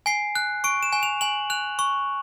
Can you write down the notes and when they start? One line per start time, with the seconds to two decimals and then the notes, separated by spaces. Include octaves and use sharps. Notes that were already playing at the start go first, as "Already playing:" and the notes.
0.06 G#5 C7
0.35 F#6
0.64 C#6 D7
0.83 E7
0.93 G#5
1.03 F7
1.21 G#5 F#7
1.50 F#6 F7
1.79 C#6